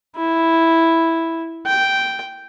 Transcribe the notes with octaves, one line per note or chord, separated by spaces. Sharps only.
E4
G5